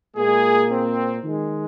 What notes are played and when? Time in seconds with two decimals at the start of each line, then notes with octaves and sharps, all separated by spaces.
0.16 A#2 G#3 A#3 G#4
0.71 C4
1.23 D#3 G#3